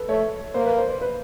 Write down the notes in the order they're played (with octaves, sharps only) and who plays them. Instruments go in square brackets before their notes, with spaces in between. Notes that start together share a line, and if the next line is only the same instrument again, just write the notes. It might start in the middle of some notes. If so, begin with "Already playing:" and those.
Already playing: [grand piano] A4 B4
[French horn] A3 [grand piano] C#5
[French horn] A#3 [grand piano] C5
[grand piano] B4
C5
C5
B4